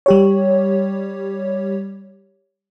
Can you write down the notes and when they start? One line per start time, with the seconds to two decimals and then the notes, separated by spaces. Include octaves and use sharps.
0.06 G3 G4 C#5